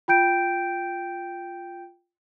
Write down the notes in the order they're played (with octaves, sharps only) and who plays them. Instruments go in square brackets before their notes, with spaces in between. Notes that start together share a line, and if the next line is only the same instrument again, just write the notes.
[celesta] F4 G5 G6 D7